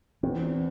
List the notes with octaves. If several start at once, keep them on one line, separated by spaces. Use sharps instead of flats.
E2 C4